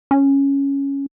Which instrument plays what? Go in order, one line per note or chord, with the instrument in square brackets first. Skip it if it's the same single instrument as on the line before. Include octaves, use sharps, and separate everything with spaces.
[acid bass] C#4